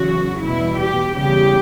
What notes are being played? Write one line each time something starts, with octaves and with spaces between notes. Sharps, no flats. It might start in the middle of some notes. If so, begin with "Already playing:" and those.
Already playing: E2 C#3 F#3 F#4
E2 B2 G3 E4
G4
E2 C#3 G3 G4